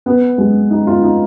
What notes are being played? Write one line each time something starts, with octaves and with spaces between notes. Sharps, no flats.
B3
G#3
D#4
F4
D#4